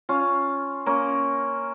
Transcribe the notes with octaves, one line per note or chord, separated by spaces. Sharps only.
C#4 F4
A#3 C#4